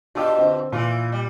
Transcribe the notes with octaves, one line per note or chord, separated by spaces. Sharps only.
B2 D4 F4 G4 E6
D3 C4
A#2 E3 F4
G3